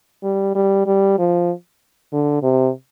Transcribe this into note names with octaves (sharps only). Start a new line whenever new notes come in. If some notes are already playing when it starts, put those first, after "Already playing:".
G3
G3
G3
F3
D3
C3